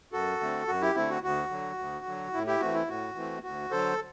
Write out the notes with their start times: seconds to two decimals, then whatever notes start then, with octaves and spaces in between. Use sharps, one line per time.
0.12 F#2 F#4 A4
0.40 D3 A3 C4
0.67 F#2 F#4
0.81 E4 G4
0.95 D3 A3 C4 E4
1.10 F#4
1.23 D2 F#4
1.50 D3 F#3
1.79 D2
2.06 D3 F#3
2.33 A2 E4
2.47 E4 G4
2.60 E3 A3 C4 F#4
2.74 E4
2.88 A2 F#4
3.15 E3 A3 C4
3.43 D2 F#4
3.71 D3 F#3 A4 C5